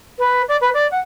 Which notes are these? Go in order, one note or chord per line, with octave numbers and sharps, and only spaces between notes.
B4
D5
B4
D5
F#5